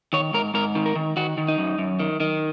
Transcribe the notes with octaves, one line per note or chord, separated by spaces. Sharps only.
D#3 C#5
G#2 A#4
G#2 A#4
D#3
A#4
D#3
D#3 F#4
D#3
D#4
F#2
F#2
D#3
D#3